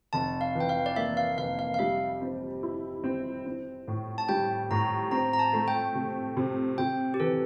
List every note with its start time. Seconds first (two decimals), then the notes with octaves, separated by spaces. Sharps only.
0.13 F1 A5
0.41 F5
0.55 E3
0.60 G5
0.69 F5
0.86 D5
0.96 A#3 E5
1.17 F5
1.38 F1 F5
1.59 F5
1.74 F5
1.79 G3 E5
2.21 C4
2.63 E4
3.04 C4
3.46 C4
3.88 A2
4.18 A5
4.29 G3 G5
4.71 A2 A#5
5.11 C4 A#5
5.33 A#5
5.39 A5
5.53 A3
5.68 G5
5.95 C3
6.37 C3
6.78 C3 G5
7.14 G4
7.20 E3 A4